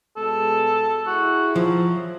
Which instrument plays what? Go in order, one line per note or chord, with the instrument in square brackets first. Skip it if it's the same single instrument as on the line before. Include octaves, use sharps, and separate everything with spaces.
[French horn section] B2 G#3 [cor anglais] A4
[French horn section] E4 G#4 [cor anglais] F#4
[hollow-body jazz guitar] F3 [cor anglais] F#3